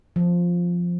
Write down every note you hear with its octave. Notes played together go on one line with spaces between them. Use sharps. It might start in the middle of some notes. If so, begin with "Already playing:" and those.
F3